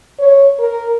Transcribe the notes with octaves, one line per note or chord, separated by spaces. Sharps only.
C#5
A#4